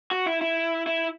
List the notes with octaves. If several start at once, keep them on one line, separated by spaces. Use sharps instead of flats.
F#4
E4
E4
E4